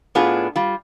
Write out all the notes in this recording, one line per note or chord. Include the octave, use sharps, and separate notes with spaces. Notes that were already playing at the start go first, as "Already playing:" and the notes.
A2 B3 D4 F4 G#4
G3 F4